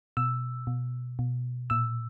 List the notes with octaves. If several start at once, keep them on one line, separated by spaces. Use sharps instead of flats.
B2 E6
B2
B2
A#2 E6